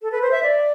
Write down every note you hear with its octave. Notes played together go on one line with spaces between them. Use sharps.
A4
B4
C5
E5
D5